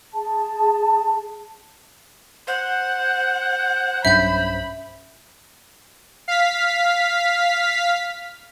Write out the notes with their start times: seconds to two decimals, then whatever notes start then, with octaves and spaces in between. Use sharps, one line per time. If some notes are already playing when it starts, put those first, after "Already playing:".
0.13 G#4 A5
2.47 C5 F#5
4.05 B1 G2 C#4 E5 B5 G6
6.28 F5 B6